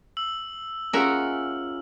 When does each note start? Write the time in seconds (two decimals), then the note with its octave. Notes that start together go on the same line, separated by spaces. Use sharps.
0.17 E6 F#7
0.93 C#4 F4 G#4 A#4 E5 F#5